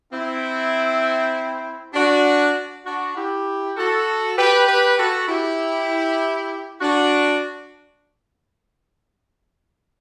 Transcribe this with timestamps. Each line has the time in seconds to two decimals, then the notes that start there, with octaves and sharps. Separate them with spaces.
0.11 C4 E4
1.94 D4 F#4
2.85 D4 F#4
3.16 E4 G4
3.76 F#4 A4
4.37 G4 B4
4.67 G4 B4
4.98 F#4 A4
5.28 E4 G4
6.81 D4 F#4